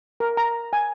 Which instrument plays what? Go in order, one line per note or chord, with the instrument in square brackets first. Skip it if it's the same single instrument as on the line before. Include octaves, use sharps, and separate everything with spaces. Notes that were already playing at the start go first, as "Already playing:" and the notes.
[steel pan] A#4
A#5
G#5